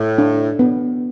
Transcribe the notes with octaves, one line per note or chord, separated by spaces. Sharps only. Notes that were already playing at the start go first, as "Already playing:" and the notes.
Already playing: A2
D4
B3